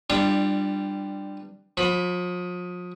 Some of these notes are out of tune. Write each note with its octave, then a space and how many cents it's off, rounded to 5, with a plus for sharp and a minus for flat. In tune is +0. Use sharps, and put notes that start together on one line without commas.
G3 +0 D4 +20 F4 -25
F3 +40 B5 +5